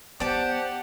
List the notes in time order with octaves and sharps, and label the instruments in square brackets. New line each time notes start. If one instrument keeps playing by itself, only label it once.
[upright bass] B3 [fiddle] G4 F#5 [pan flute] C5 [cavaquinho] D5 A5